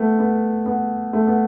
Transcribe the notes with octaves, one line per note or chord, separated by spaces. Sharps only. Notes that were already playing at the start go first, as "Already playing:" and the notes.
Already playing: A3 B3
B3
B3
A3
B3